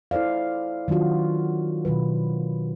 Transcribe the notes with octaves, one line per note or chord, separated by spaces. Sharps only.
E4 A4 C5 D5 F5
D#3 F#3 D4 F4 F#4
B2 D#3 F#3 B4